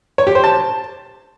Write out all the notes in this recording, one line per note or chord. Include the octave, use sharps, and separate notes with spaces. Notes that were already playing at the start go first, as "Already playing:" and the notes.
C#5
G4
C5
A5